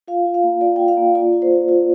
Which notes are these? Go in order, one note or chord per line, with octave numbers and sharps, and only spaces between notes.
F4 F5
F4
F5
A#3
F4 D5
F4 G5
F5
A#3
F4 D5
F4
C5
F4
F4